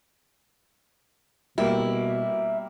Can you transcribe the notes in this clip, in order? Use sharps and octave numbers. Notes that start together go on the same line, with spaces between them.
B2 G3 A#3 E4